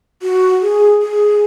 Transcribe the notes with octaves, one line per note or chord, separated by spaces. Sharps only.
F#4
G#4
G#4